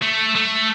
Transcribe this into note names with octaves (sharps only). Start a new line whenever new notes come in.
A3
A3